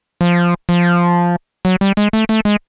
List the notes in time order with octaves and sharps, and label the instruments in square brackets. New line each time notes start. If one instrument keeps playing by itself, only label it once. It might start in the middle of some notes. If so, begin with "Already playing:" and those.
[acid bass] F3
F3
F#3
G3
G#3
A3
A3
G#3